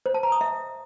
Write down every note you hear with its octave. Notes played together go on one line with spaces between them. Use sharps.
C5
A5
A#5
D#6
E5